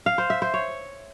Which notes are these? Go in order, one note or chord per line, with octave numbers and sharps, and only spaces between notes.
F5
C5
E5
C5
C#5